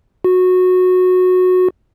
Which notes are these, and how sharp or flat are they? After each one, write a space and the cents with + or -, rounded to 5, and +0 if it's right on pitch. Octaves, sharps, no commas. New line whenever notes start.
F#4 -15